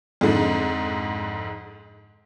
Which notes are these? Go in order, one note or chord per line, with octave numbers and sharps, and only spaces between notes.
F2 G#2 D3